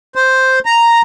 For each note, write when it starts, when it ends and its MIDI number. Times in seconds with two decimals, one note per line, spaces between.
0.15 0.59 72
0.66 1.02 82